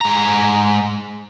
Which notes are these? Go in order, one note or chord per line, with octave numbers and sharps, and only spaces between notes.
G#2 A#5